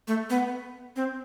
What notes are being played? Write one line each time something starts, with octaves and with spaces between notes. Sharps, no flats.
A3
B3
C4